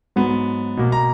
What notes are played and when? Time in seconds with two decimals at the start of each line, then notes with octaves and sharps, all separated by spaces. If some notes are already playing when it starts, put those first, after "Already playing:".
0.16 G#2 F#3 B3
0.77 B2 A#3
0.92 A#5